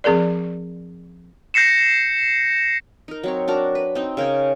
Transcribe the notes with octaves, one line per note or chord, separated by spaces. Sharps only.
F3 C4 G#4 A#4 D5
G6 A#6 C7 C#7 E7
D#4 A#4
F#3 C4 C#5
D4 F#4 A#4
B4
C4 D#4
C#3 A#4 G5 G#5